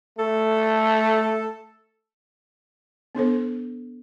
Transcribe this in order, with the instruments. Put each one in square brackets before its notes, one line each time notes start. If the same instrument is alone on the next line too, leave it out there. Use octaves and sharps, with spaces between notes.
[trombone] A3 [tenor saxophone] A4
[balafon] B3 D4 A4 C5